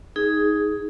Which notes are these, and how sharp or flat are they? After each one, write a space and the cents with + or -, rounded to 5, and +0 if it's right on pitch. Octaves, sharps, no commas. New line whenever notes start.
D#4 +10 G#4 +0